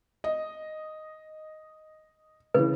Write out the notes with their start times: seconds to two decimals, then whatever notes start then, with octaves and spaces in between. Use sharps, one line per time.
0.24 D#5
2.54 C#3 E3 B4